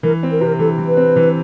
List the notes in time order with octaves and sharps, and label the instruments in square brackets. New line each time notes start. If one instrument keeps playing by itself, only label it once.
[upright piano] E3 [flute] A#4
[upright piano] C4
[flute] A#4
[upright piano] C3 [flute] B4
[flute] A#4
[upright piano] E3 [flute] A4
[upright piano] E3
[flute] B4
[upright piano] C4
E3